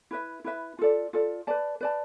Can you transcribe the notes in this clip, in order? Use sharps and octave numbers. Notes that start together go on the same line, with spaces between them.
E4 B4 E5
E4 B4 E5
F4 A4 D5
F4 A4 D5
B4 D5 A5
B4 D5 A5